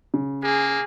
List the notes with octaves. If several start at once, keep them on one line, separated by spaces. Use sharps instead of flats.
C#3
A#3 G#4